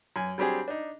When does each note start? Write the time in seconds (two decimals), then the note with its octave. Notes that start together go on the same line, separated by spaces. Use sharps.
0.16 F#2 G#5
0.38 F#3 G3 C4 D4 G4 G#4
0.68 D4 D#4